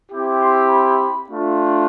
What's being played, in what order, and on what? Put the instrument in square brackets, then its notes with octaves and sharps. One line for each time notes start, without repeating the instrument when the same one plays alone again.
[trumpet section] C4 E4 G4
C6
B5
A3 D4 F4